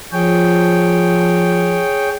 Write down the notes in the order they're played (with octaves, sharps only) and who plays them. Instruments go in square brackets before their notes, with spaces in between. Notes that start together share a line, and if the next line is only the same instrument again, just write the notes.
[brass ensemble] F3 [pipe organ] G#4 C#5 G5